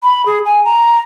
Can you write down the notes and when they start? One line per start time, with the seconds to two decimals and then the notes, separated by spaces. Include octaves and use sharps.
0.03 B5
0.26 G#4
0.45 G#5
0.65 A#5